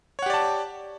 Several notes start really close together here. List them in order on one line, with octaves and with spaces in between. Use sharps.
C#5 F#5 G4 D5 A5